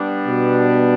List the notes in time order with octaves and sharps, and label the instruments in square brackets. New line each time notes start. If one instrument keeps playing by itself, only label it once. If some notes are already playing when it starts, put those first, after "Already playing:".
Already playing: [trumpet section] G3 B3 D4
[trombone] B2